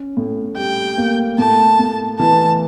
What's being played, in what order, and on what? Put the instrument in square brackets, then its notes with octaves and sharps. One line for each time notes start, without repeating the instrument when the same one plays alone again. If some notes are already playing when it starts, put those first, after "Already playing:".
Already playing: [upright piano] C#4
A2
[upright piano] G3 [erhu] G5
[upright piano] A#3
[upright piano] A2 [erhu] A5
[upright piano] A2
[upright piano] E3 [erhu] A5